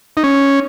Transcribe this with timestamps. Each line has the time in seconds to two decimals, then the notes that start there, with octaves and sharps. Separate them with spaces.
0.17 D#4
0.24 C#4